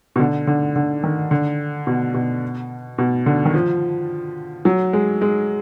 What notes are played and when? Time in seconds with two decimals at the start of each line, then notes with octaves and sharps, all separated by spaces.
0.16 B2
0.19 D3
0.47 D3
0.76 D3
1.04 D#3
1.31 D3
1.87 B2
2.14 B2
2.98 B2
3.26 D3
3.45 D#3
3.54 F3
4.65 F#3
4.93 G#3
5.21 G#3